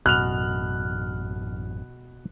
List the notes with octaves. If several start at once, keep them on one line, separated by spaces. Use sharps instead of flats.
A1 F#2 B2 F6 F#6 F7